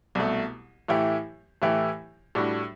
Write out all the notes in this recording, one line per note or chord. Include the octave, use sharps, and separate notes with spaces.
C2 B2 A3
A2 E3 A3 E4 G4
A2 E3 A3 E4 G4
A2 G3 D4 F#4